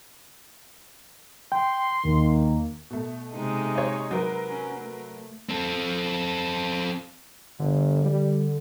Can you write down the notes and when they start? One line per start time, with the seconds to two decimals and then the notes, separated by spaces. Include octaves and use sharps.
1.52 G5 C6
2.05 D#2 D#3 A#3
2.90 B2 A3
3.35 C3 G#3 D#4
3.75 C#5 D#5
4.11 F#3 A#4 B4
4.48 C#4
4.79 A3
5.49 C4 A4
7.59 G1 D3
8.05 G3